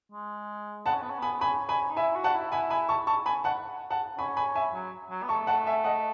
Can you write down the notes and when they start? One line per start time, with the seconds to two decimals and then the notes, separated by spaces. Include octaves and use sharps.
0.12 G#3
0.86 B3 F#5 A5
0.94 C#4
1.02 B3
1.10 C#4
1.19 B3 G#5 B5
1.41 C#4 G#5 B5
1.69 G#5 B5
1.90 D#4
1.97 E4 E5 G#5
2.15 F#4
2.24 F#5 A5
2.34 E4
2.52 E4 G#5 B5
2.70 G#5 B5
2.89 A5 C#6
3.07 A5 C#6
3.26 G#5 B5
3.44 F#5 A5
3.90 F#5 A5
4.18 C#4 G#5 B5
4.37 G#5 B5
4.55 E5 G#5
4.74 F#3
5.10 F#3
5.23 B3
5.29 A3 A5 C#6
5.47 F#5 A5
5.66 E5 G#5
5.84 D#5 F#5